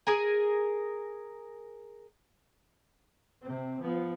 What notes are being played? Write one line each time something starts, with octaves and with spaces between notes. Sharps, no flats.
G#4 A#4 G#5
C3 C4
F3 B3